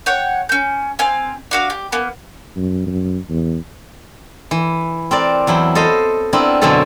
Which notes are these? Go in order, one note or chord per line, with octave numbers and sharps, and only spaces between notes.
C#5 F#5 G5
C#4 G6
C4 F5 G#5
D4 F#4 F5
G4
A#3 B3
F#2
F#2
E2
E3
C4 A#4 D5
E2 F#3 E4 G5
A4 C5 D#5 F5
B3 C4 D4 E4 A#4
F#2 B2 D3 C4 C#4 A4